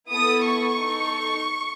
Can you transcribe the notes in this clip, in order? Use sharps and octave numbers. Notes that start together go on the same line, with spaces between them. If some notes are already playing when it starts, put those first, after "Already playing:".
B3 E4 A4 D#6
C#6
D#4 A4